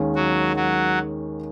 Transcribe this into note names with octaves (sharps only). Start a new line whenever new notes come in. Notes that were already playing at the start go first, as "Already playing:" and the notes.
Already playing: D#2 D#3 G#3 C#4
F#3 F#4
F#3 F#4